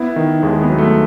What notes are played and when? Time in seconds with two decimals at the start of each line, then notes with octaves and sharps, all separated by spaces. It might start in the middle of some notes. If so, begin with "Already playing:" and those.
Already playing: B3 E4
0.16 D#3
0.42 D#2 G#3
0.61 B3
0.70 F#3
0.78 A3